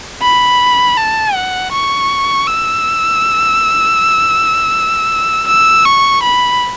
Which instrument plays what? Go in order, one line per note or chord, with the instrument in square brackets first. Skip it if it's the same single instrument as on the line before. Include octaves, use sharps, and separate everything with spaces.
[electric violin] B5
A5
F#5
C#6
E6
E6
C#6
B5